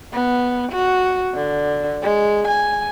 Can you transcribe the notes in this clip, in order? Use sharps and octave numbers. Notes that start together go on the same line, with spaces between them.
B3
F#4
D3
G#3
G#5